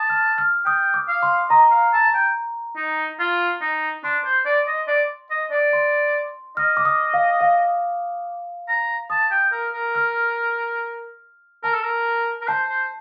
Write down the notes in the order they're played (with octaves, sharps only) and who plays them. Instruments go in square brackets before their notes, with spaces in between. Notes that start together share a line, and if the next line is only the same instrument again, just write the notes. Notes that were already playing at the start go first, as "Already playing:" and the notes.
Already playing: [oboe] A5 [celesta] D#6
[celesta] F6
F6
[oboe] G5 [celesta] D#6
[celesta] D6
[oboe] F5
[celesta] C6
[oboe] D#5 [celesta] A#5
[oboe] F5
A5
G5
D#4
F4
D#4
[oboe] D4 [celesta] C6
[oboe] C5
D5
D#5
D5
D#5
D5
[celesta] C6
[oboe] D#5 [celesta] F6
[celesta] D6
D#6
F5
F5
[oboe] A#5
[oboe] A5 [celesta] D#6
[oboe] G5
A#4
A#4
[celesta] F6
[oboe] A#4 [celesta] A5
[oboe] A4
A#4
A#4
[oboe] C5 [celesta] A5
[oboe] C5